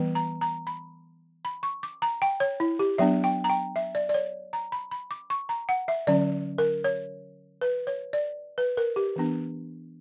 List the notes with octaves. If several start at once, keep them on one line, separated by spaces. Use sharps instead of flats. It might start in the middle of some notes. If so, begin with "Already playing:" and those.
Already playing: E3 G3 B3
A#5
A#5
B5
B5
C#6
D6
A#5
G5
C#5
E4
G4
F#3 B3 D4 E5
G5
A#5
G5
E5
D5
D5
C#5
A#5
B5
B5
D6
C#6
A#5
F#5
E5
D3 F#3 C#4 D5
A#4
C#5
B4
C#5
D5
B4
A#4
G4
E3 B3 D4